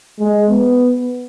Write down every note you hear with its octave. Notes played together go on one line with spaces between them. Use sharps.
G#3
B3